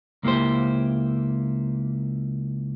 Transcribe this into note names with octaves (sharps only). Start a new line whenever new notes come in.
C#2 A#3 E4 G4 C5